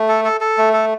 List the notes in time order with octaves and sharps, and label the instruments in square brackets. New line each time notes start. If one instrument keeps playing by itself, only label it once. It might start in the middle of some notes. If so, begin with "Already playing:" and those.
Already playing: [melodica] A3
A4
A4
A4
A3
A4